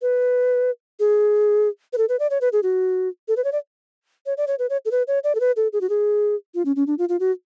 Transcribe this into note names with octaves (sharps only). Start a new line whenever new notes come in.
B4
G#4
B4
A4
B4
D5
C#5
B4
G#4
F#4
A4
B4
C#5
D5
C#5
D5
C#5
B4
C#5
A4
B4
C#5
D5
A4
B4
A4
G#4
F#4
G#4
F4
C#4
C#4
D4
F4
F4
F#4